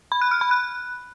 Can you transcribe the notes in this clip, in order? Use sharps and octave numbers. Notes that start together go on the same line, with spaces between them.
B5
F#6
F6
B5
F#6